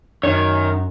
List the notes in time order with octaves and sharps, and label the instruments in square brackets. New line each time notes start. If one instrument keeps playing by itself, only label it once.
[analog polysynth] F#2 [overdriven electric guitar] D#3 [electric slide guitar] C#5